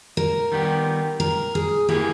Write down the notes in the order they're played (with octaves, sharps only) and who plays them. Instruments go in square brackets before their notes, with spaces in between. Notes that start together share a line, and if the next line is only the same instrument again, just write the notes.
[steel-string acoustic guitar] A#4
[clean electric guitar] D#3 G3 B3 G4
[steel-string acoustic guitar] A#4
G#4
[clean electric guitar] E3 A#3 E4 G#4 [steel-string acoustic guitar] G4